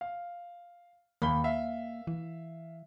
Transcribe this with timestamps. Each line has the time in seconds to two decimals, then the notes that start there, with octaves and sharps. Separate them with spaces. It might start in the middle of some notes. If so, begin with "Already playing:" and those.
0.01 F5
1.22 D#2 A#3 B5 G7
1.44 E5 F5
2.07 E3